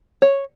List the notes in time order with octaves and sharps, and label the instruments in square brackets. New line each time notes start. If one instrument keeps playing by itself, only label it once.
[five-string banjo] C#5